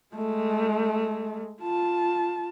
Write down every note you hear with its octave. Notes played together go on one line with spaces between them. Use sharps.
G#3 A3
F4 A5